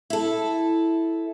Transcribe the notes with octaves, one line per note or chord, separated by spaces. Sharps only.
E4 A4